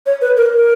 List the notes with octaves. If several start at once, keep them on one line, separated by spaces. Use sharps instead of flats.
C#5
B4
A#4
A#4